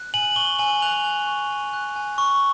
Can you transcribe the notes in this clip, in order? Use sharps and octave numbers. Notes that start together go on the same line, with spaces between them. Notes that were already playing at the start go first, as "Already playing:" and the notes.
Already playing: F#6
G#5 F#7
C#6 G7
G#5 F#7
F#6 F7
G#5
C#6
G#5
F#6
G#5
C#6